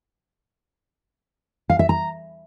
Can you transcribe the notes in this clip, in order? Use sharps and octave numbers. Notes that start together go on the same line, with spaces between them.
F5
E5
A#5